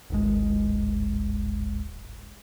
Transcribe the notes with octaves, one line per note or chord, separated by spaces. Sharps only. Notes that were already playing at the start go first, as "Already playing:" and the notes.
D1 G#1 G#3